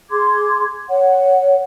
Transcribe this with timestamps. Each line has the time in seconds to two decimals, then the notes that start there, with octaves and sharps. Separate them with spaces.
0.10 G#4 C6 D6 G#6
0.89 C#5 F#5